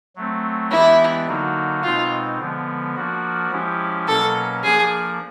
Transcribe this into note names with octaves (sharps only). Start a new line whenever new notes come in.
F#3 A3 C4
E3 G#3 B3 D4 E4 G4
D3 F#3 A#3 D#4 F#4
B2 G#3 C4 D#4 F4
D3 F3 G#3 B3
F3 A#3 D4 F#4
F3 G#3 C#4 E4 G4
B2 F#3 A#3 C#4 A4
F3 A#3 D4 G#4